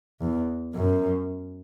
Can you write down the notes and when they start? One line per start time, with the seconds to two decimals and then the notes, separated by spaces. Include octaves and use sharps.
0.21 E2
0.74 F#2